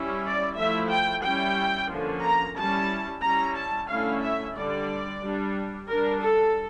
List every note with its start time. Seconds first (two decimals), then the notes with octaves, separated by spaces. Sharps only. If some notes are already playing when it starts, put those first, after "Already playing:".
Already playing: G3 C#4 E4
0.24 D5
0.57 F3 A3 E4 E5
0.91 G5
1.23 G3 C#4 E4 G5
1.90 D3 F3 A#3 C#4
2.23 A#5
2.56 G3 C#4 E4 A5
3.22 G3 C#4 E4 A#5
3.56 A5
3.89 D3 A3 C#4 E4 F5
4.23 E5
4.56 D3 G3 D4 D5
5.22 G3 D4
5.89 G3 D4 A#4
6.22 A4